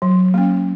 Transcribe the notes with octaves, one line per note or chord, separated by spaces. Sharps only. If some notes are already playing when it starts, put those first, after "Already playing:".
F#3
A#3 C#4